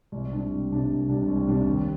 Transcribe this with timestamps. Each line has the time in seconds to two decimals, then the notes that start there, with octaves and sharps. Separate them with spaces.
0.12 C2
0.31 C3 G3 D4
0.50 C2
0.71 C3 G3 D4
0.89 C2
1.09 C3 G3 D4
1.28 C2
1.47 C3 G3 D4
1.67 D#2